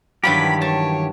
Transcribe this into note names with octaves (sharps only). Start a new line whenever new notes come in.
G2 D#3 E3 F#3 F4 G4 B5
C#5 A5